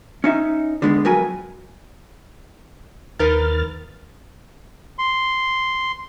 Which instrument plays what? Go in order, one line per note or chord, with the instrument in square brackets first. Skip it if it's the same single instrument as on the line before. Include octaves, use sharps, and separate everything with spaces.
[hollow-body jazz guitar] C#4 D#4 E5
D3 G#3 B3
F2 F#3 A#4 B4 G#5
[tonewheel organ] D#2 F6 A6 [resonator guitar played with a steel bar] D#4 A#4 B4
[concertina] C6